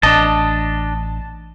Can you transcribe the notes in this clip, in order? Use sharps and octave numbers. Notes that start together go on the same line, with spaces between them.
A1 D4 D#5 A5